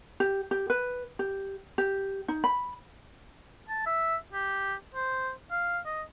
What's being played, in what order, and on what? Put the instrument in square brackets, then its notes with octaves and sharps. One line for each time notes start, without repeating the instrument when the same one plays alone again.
[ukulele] G4
G4
B4
G4
G4
D#4
B5
[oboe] A5
E5
G4
C5
F5
D#5